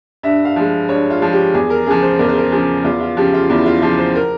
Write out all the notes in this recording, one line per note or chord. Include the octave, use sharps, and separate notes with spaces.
G2 E5
F5
F3 G#3
G2 C#5
F4
F3 G#3
G4
E2 G#4
A#4
C#3 F3 G#4
C5
E2 A#4
C5
A#4
C#3 F3 G#4
E2 F4
F4
C#3 F3 G4
F4
E2 E4
F4
C#3 F3 F4
C5
A#4